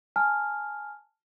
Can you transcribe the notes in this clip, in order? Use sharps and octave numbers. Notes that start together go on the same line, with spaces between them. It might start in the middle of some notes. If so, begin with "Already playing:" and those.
G#5 A5 F6